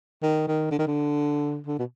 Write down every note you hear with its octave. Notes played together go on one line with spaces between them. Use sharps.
D#3
D#3
D3
D#3
D3
D3
B2